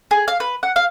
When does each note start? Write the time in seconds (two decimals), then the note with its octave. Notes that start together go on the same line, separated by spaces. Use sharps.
0.11 G#4
0.28 F5
0.40 B4
0.63 F#5
0.76 F5